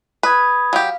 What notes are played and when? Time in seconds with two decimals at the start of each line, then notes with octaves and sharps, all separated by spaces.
0.23 B4 B5 D#6 G#6
0.73 F#3 G4 F5